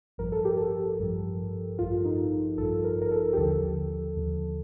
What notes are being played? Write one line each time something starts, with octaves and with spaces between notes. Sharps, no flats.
A1 G2 F3 A#4
A4
G4
A4
A1 G2 F3
A1 G2 F3 F4
D#4
A1 G2 F3 A4
A#4
A#4
A4
G4
D#2 D3 F3 A4
D#2 D3 F3